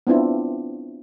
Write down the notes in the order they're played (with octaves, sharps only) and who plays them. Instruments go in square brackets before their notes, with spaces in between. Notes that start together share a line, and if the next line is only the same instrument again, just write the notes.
[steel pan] B3 C4 D4 E4 F4